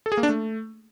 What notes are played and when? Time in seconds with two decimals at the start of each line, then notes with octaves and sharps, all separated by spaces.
0.06 A4
0.12 G#4
0.17 A#3
0.23 D4
0.29 A3